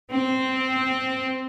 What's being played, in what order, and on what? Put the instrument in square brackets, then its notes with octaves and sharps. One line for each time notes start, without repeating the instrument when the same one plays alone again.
[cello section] C4